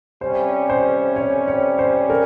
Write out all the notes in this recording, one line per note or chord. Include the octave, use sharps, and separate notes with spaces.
C3 G3 C#4 C5
C5
C#5
C#5
C5
A#4